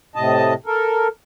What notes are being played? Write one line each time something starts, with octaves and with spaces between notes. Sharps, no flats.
A2 C3 D#5 A5
A4 A#4